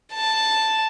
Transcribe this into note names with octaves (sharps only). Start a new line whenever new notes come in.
A5